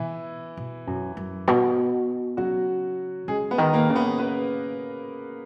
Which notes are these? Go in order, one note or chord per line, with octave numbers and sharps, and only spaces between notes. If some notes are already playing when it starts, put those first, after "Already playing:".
Already playing: B2 E3 E4
B2
F#2
F#2
B2
C#3 F#3 F#4
C#3 G#3 G#4
B3 B4
D#3
A#3 A#4
C#3
B3 B4
B3 B4